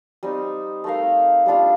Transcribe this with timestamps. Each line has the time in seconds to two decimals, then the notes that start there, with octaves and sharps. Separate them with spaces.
0.23 G3 C4 D#4
0.84 A3 D#4 A#4 F5
1.46 G3 D4 F4